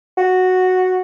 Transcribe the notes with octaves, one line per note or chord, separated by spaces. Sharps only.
F#4